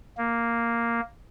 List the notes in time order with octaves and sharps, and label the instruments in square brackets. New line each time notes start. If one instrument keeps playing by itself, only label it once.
[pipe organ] A#3